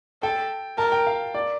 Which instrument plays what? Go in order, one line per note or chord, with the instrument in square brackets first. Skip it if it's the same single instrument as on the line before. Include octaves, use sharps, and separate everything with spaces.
[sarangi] A4 [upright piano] G5
[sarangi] A#4 [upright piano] A5
[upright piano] G5
F5
D5